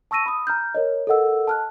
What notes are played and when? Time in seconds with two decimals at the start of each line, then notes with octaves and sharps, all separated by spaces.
0.11 A5 C#6 E6 A#6 D#7
0.26 B5 D#6
0.47 A#5 F6 G6
0.75 A#4 C#5 D#5
1.07 A4 A#4 D#5 F#5 E6
1.47 A5 F6 F#6